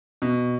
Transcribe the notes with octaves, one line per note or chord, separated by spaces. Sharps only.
B2